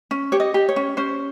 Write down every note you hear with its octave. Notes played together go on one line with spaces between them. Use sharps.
C#4
G4 C#5
D#5
G4
C#5
C#4
C#4 C5